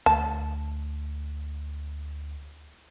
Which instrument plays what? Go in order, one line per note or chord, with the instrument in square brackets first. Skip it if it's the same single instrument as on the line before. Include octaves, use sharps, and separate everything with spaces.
[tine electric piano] D2 [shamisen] A5